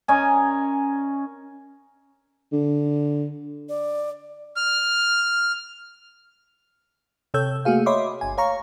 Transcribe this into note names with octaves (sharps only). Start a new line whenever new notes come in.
C#4 A#4 D#5 G#5
D3
D5
F6
C3 A4 C#5 E6 G6
A3 A#3 F#4 G#4 F5
C#5 D#5 E5 B5 C6 D6
G1 G#5
C#5 F5 A#5 C#6